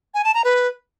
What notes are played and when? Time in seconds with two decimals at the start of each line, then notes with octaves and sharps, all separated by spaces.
0.14 G#5
0.24 A5
0.34 A#5
0.44 B4